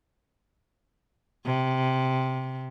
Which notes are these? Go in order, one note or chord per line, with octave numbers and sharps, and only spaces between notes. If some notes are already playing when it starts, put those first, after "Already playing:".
C3